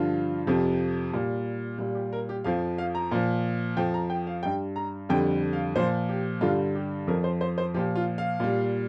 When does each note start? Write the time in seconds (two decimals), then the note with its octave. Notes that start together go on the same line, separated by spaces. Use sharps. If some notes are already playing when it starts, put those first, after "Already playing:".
Already playing: G2 D3 F3 F4
0.47 F2 C3 F3
1.13 A#2 G3
1.78 A#2 G3
1.95 G4
2.13 A#4
2.29 G4
2.44 F2 F3 F5
2.78 F5
2.95 A#5
3.11 A#2 F3
3.77 F2 F3 G5
3.94 A#5
4.10 G5
4.27 F5
4.43 G2 G3 G5
4.76 A#5
5.09 F2 D3 G3 G5
5.53 F5
5.76 A#2 F3 C5
6.09 G4
6.41 G2 D3 G3 F4
6.75 G4
7.08 F2 F3 A#4
7.24 C5
7.41 C5
7.58 C5
7.74 A#2 F3 G4
7.95 F4
8.18 F5
8.40 A#2 G3